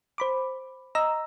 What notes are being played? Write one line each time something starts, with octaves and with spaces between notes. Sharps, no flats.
C5 B5 D6
D#5 A#5 E6